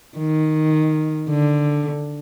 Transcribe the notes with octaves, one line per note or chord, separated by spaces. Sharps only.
D#3
D3